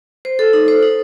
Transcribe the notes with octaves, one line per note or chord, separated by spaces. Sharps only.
C5
A4
D#4
C5
D#4